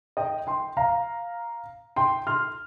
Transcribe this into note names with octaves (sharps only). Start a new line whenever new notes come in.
D#5 G5
G5 C6
F5 A#5
G5 C6
C6 F6